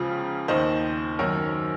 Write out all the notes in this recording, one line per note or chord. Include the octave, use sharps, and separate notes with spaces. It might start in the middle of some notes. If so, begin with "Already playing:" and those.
Already playing: C#2 C#3 F3
D#2 D#3 C5 D#5
F#2 D#3 A#4 C#5